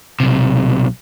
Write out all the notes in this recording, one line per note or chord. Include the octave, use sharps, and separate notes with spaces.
B1 C3